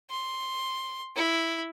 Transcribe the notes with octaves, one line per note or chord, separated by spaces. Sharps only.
C6
E4